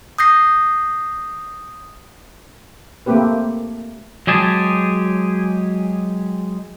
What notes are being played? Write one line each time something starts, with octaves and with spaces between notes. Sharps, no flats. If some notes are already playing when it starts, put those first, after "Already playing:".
D#6 G6 A#6 C7
A3 A#3 C4 G4 B4
F#3 G#3 G4 G#4 A5